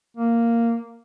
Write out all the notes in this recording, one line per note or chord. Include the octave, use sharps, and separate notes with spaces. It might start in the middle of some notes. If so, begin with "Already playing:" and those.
A#3